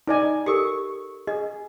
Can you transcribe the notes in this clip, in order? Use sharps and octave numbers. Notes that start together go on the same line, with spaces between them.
D#4 D5 G#5 A5
G4 A4 A#4 C#6
G#4 D#5